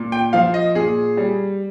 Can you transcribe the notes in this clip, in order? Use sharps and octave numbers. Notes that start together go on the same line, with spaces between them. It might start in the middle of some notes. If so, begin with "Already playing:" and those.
Already playing: A#2
G5
F3 F5
D#5
A#2 G#4
G3